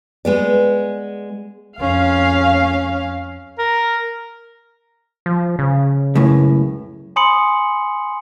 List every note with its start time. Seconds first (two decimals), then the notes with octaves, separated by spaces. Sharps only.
0.25 G#3 B3 D5
1.79 F2 C#4 F5
3.58 A#4
5.26 F3
5.59 C#3
6.15 C#2 F#2 A2
7.16 G#5 B5 C6 D#6 C#7 F#7